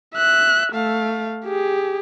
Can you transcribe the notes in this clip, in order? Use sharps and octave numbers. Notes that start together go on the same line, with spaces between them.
E5 F#6
A3 F5
G4 G#4